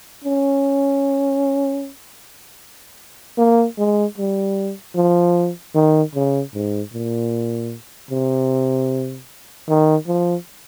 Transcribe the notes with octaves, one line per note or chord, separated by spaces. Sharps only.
C#4
A#3
G#3
G3
F3
D#3
C#3
G#2
A#2
C3
D#3
F3